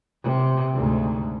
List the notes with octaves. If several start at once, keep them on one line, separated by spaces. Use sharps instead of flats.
C3
D2 G#2